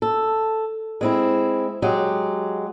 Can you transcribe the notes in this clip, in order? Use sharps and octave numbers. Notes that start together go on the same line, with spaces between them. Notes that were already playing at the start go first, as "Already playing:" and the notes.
A4
G#3 C4 E4
F#3 G#3 G4